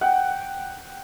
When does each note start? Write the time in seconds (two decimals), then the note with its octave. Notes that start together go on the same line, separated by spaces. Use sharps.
0.01 F#5 G5